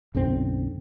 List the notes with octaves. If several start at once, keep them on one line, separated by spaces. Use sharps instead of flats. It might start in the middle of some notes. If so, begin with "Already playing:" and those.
B1 F#2 D3 C4